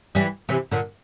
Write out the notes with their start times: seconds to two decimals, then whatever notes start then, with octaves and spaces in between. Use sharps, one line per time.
0.15 E3 G3
0.49 C3 E3
0.71 A#2 D3